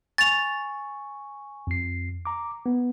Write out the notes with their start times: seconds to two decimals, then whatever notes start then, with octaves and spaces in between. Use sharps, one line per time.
0.18 G#5 C#6 A6 F7
1.67 F2 C7
2.25 A#5 D6
2.66 B3